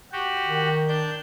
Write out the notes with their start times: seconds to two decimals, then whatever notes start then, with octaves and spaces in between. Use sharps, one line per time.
0.12 F#4 G4
0.46 D#3
0.88 D4 G6